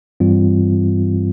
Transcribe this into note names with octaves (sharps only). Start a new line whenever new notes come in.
G2 E3 G3 C4 F4